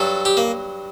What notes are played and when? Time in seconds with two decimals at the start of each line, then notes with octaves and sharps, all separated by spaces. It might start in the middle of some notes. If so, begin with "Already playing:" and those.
Already playing: G2 F#3 A4
0.25 G4
0.37 A#3